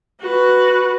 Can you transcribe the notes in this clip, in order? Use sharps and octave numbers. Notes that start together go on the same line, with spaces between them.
F#4 B4